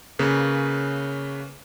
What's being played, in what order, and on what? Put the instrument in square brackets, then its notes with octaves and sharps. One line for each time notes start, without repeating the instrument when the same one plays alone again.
[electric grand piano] C#3 A#3 B4 C#5